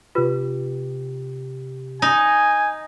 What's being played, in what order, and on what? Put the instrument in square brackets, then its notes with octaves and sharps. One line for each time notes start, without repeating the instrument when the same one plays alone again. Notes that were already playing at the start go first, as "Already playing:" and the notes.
[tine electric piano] C3 G4 [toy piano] F4 B4
[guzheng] D#4 [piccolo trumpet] G#5